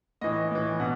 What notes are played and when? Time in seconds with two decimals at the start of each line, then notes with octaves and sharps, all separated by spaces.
0.21 A2 E3 D#5
0.51 A2 E3
0.80 B2 F#5